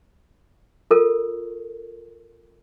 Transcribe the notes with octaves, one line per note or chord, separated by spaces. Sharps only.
F4 A4 A#4